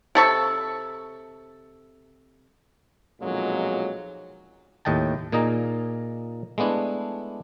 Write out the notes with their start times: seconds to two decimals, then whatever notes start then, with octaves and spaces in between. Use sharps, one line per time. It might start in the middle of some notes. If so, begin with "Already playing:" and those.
0.15 C3 A4 C#6
3.21 B1 F2 A#2 F#3 G#3
4.85 D#2 A2 D#5 G5 A5
5.32 A#2 A#3 D#4 G#4 D#5 A#5
6.58 G#3 A3 B3 D4 E4